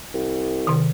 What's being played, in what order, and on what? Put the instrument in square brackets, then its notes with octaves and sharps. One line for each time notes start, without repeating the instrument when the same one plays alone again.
[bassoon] C2
[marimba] C3 D#3